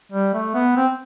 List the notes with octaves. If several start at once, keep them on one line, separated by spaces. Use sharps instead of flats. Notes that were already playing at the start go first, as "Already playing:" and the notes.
G3
A3
B3
C4